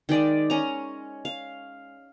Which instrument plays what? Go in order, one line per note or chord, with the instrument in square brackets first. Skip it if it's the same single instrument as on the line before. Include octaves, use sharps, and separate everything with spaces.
[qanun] D#3 G#3 D5
C#4 A#5
F5